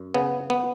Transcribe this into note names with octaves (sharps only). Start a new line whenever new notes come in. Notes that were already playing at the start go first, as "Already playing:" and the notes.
Already playing: F#2
C#3 B3
B3